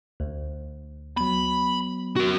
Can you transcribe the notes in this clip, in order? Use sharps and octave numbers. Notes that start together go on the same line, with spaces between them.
D2
F#3 B3 B5
F#4 A#4